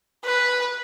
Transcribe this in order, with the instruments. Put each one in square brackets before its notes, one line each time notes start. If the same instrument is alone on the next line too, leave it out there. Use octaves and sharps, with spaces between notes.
[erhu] B4